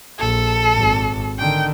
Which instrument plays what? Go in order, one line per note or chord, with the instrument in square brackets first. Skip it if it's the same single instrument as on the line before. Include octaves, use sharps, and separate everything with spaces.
[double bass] A#1 [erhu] A4
[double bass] G#1
[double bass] D3 D#3 [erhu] G5